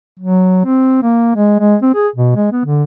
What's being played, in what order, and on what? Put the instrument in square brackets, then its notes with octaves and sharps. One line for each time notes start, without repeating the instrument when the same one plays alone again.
[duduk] F#3
C4
A#3
G#3
G#3
C4
G#4
B2
G#3
B3
D3